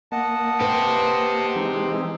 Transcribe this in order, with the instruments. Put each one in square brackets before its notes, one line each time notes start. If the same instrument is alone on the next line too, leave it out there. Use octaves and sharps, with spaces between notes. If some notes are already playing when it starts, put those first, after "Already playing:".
[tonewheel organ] A#3 [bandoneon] D#5 F#5 A5
[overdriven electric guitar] G4 C5 [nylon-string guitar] B4
[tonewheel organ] E3 G#3 C4 [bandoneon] D#4